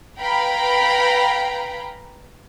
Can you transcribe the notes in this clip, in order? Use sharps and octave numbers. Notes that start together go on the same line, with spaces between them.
B4 F5 G5 G#5 A#5 B5